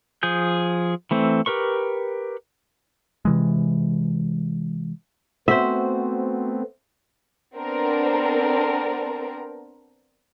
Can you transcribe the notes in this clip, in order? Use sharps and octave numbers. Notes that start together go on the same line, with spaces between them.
F3 G#4 G6
E3 A3 C4
G4 A#4 B4 C#6
C3 E3 G#3
A3 B3 C4 F#4 C5 E5
B3 C4 D4 A4 A#4